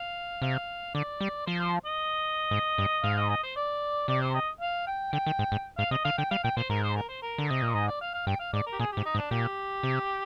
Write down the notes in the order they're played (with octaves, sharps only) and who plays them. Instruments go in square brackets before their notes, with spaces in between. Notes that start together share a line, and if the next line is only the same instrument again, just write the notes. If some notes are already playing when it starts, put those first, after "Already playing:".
Already playing: [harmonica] F5
[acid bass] C3 [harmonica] F5
[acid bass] D3 [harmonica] D5
[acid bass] G3
[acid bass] F3 [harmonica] C5
[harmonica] C5
D#5
[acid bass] G#2
G2
[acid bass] G#2 [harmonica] F5
[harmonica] D#5
D#5
C5
D5
[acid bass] C3 [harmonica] D5
[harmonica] C5
D#5
F5
G5
[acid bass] D3 [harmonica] G5
[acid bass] D#3
G#2
G#2
[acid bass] G#2 [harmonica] F5
[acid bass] C3 [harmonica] D#5
[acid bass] D3 [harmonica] F5
[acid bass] D3 [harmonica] G5
[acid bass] G3 [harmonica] F5
[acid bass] A#2 [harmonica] G5
[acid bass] A#2 [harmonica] C5
[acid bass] G#2 [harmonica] A#4
[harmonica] C5
A#4
C5
A#4
[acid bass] D3
[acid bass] C3 [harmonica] D#5
[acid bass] A#2
[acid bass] G#2 [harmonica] D#5
[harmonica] D5
F5
F5
[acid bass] G2 [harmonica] G5
[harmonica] F5
[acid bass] G#2 [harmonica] D5
[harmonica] A#4
G4
[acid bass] A#2 [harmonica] G#4
[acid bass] G#2 [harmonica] G4
[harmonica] D#4
[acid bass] G#2
[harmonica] D4
[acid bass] A#2 [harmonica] G4
[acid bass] C3